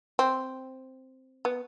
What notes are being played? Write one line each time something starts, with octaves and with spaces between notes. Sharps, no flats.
C4
B3